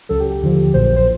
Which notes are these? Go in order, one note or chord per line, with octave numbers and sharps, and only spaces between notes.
C#2 C#3 F#3 A4
G4
G4
D#2 D3 F3
A#1 A#2 F#3 C5
C5